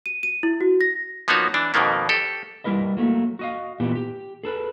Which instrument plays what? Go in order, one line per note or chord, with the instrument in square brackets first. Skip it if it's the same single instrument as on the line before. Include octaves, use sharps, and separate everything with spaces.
[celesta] D#7
D#7
E4
F#4
A#6
[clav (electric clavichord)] F3 A#3 B3 D#4 F#4 C#5
E3 D4
F2 B2 D#3 A#3 B3
G4 A4
[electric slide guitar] G3 E4 A#4 B4 D#5
F#3 A3 A#3
F#4 D#5 F5
A#2 E3 B3 G4
G4
G#4 A4 B4